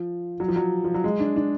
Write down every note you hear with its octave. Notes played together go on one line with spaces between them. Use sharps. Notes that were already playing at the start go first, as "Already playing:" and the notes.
Already playing: F3
F#3
F3
F#3
F3
F#3
G#3
D4
D4